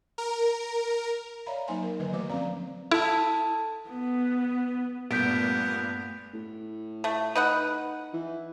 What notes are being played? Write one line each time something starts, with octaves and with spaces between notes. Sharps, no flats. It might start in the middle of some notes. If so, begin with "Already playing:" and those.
A#4
C#5 D5 E5 F5 A#5 B5
F#3 A#3 D#4 C5 G#5 C6
A#4
D3 D#3 F#3 A#3 B4 D#5
E3 A3 F#4 C5 D6
F3 C4 C#4 D5 F5 A#5
E4 A4 A5
B3
G2 A#2 A3 B3 G6 B6 D7
A2
A3
D#4 B4 F#5
E3